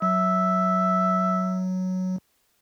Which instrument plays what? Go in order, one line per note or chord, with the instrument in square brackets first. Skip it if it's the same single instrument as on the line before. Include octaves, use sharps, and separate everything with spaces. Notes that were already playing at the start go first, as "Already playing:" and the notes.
[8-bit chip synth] F#3 [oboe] E5